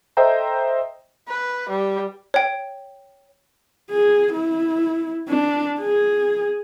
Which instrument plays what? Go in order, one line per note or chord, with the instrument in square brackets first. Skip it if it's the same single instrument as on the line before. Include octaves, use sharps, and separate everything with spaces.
[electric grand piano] A4 C5 D#5 E5 G5 A#5
[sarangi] B4
G3
[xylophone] C#5 G5
[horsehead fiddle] G#4
E4
D4
G#4